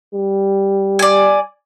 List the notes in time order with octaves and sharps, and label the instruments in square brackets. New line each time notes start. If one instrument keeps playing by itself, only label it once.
[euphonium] G3
[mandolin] D5 G#5